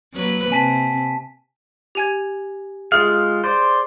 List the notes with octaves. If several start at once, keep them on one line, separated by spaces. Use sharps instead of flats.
F#3 A#3 B4
C3 G#5 A5 B6
G4 G#5 G#6
G#3 F4 G#4 F5
C5 D5